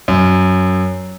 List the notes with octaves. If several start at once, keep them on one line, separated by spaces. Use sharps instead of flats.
F#2